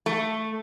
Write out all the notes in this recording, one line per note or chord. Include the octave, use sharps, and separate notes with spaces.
A3